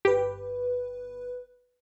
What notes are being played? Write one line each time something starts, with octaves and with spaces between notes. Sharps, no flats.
G1 G4 B4